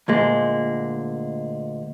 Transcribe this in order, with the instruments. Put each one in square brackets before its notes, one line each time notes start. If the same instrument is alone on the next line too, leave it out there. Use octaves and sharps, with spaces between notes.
[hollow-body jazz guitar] D2 A#2 G#3